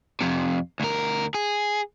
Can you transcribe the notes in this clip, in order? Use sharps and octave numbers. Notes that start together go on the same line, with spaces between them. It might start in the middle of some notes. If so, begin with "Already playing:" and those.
F2 C3
D2 A#4
G#4